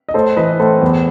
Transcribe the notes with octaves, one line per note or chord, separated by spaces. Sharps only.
D#5
A2 A4 C5
E3 B4 D#5
A2 A4 C5
E2